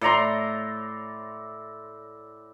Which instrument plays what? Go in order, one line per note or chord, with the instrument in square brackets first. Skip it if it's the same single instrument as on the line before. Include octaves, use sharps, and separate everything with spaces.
[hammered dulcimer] A2 D5 A#5 C6